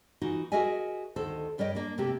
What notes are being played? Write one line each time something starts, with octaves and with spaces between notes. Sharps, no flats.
E3 D#4 F4 F#4
F#4 G#4 A#4 D#5 E5 G#5
D2 D#3 A4 C5
G2 G3 A#4 C#5 D#5
A#3 D4
C3 A3 A#3 G4